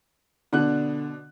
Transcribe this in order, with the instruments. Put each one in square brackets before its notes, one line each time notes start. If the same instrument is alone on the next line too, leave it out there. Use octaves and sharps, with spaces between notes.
[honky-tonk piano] B2 D4 F#6 [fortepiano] D3